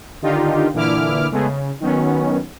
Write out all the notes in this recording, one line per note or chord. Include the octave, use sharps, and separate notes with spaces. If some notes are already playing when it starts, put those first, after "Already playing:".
D3 D#3 D4 D#4 F4 G4
A#2 D3 E3 E4 D6 F6
C#3 G#3 A3 B3 G#4
C#3
D#3 F#3 B3 C#4